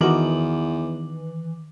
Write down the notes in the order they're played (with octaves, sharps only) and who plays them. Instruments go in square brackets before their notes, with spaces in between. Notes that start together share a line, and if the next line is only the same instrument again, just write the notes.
[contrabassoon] E2 [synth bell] D#3 D6 F#7 [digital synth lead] E3 [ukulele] D#4 F#4 A#4